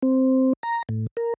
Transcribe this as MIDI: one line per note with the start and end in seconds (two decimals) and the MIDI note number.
0.02 0.53 60
0.63 0.83 82
0.89 1.07 45
1.17 1.34 70